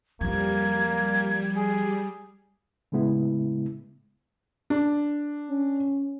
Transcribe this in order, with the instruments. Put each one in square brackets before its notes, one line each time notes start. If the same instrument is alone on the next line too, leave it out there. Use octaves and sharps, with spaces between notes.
[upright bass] F2 F3 [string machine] G3 [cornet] A#3 [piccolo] G#6
[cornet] G#4
[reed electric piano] A2 C#3 G#3 B3 E4
[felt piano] D4
[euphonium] C#4